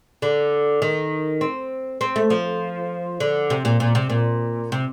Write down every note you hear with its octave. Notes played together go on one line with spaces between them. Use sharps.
D3
D#3
C4
C4
A3
F3
D3
C3
A#2
A#2
C3
A#2
C3